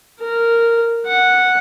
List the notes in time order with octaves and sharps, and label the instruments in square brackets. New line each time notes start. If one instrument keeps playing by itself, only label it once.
[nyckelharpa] A#4
F#5